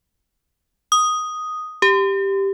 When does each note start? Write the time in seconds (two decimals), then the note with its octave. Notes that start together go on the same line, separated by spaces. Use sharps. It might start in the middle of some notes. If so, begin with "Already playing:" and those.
0.92 D#6
1.82 G4